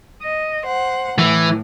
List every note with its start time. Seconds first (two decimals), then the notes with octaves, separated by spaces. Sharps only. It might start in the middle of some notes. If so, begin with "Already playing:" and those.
0.20 D#5
0.66 C5 F#5
1.19 A2 E3